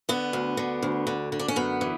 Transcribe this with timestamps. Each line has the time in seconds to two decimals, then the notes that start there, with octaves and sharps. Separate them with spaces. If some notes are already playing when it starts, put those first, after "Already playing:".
0.09 D3 B3
0.33 D2
0.57 D3
0.82 D2
1.07 D3
1.32 D3
1.39 D4
1.48 C#4
1.56 F#2 B3
1.81 E3